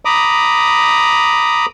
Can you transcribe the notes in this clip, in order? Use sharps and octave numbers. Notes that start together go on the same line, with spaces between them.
A#5 B5 D6 D#6